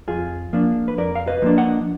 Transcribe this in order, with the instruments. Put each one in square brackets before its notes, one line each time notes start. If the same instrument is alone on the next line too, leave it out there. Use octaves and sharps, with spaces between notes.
[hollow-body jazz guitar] F2 F4 G#4
F3 A#3 D4
B4
F2 A#4 D5
F5
B4 D#5
F3 A#3 D4
D#5 F#5